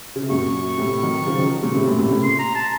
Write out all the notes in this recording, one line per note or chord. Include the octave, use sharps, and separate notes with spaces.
C#3
C3
F#2 A#2 C#6
A2 C3
D#3 F#3
C#3 F3
D#3 F#3
A#2 C#3
A2 C3
F#2 A#2
A2 C3
A#2 C#3
C6
A#5
A5